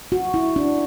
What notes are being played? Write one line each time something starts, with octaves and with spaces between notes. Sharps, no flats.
F#4
E4
D4